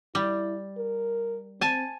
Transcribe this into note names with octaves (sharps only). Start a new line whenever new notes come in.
G3 E4
A#4
C4 G#5 A5